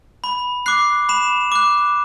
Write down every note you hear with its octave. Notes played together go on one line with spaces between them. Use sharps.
B5
D6 F#6 C7
B5 E7
D6 F#6